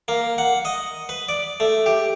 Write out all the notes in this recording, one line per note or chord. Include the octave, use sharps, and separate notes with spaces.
A#3
F#5
D#5
B4
D5
A3
G4